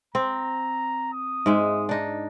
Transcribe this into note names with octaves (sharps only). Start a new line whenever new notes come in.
C4 A#5
D#6
G#2 G#3 E5
D4 D#4